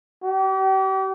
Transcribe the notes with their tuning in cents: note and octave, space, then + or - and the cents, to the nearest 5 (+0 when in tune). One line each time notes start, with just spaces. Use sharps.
G4 -40